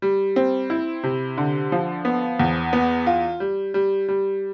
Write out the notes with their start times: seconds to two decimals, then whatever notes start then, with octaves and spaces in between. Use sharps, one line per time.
0.02 G3
0.36 C4
0.70 E4
1.03 C3
1.38 D3
1.72 F3
2.05 B3
2.40 E2
2.73 B3
3.07 F4
3.40 G3
3.74 G3
4.08 G3